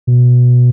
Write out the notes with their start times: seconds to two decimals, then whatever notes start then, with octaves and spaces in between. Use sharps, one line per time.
0.07 B2